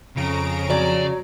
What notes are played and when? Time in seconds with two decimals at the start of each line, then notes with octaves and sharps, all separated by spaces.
0.16 F2 C#3 A#5 D7
0.70 F#3 D5